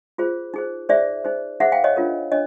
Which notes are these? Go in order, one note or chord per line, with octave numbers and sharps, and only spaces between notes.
F4 G#4 C5
D#4 G#4 C5
D#4 G#4 C5 D5 E5
D#4 G#4 C5
D#4 G#4 C5 E5 F#5
F5 G5
C#5 D#5
D4 F4 A#4 C#5
D4 C#5 D#5